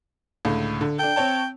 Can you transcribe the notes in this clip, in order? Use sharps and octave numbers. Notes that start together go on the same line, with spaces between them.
C#2 A2 D3
D3
D4 A4 G5
C4 C#5 A5